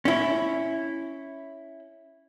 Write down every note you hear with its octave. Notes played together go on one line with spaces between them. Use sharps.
C#4 E4